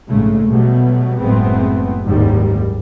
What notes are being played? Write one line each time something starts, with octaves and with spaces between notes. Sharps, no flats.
A#1 G#2 C#3 G#3 A3
B2 F#3 G3 A3 B3
F#1 A2 G#3 A3 B3 C4
F#1 D#2 G#2 D#3 G3